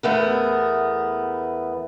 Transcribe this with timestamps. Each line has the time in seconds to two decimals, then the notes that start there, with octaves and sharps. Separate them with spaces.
0.03 E2 A3 B3 A#4